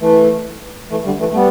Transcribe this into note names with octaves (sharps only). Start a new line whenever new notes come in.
E3 A3
E3 A3
D3 G3
E3 A3
A3
G3 B3